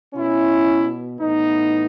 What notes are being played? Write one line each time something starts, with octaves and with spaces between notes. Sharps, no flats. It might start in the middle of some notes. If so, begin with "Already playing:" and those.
B2 C#4 E4
A2 E3 B3 D#4